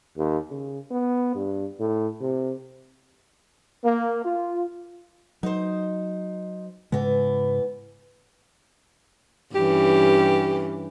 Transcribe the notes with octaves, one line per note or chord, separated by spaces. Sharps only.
D#2
C#3
B3
G2
A2
C3
A#3
F4
F#3 D#4 C5
G#2 C#3 E3 G#3 B3
G2 E3 C#4 G4